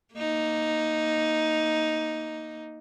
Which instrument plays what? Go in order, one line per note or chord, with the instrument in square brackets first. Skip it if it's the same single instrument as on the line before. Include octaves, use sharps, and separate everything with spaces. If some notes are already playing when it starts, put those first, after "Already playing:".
[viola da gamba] A#3 D#4